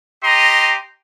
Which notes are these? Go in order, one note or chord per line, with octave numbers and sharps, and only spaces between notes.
G4 D#5 A#5 C6